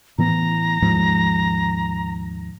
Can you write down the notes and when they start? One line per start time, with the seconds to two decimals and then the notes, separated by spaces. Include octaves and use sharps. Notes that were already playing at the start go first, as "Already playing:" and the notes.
0.18 A2 E3 B3 A#5
0.82 D#2 G#2 F3